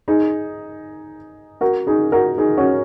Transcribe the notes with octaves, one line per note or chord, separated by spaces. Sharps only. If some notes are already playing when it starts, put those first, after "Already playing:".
D#4 G#4
F#4 A#4
D#4 G#4
F#4 A#4
D#4 G#4
C#4 F#4